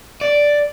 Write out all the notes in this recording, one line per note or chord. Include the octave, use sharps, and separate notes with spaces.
D5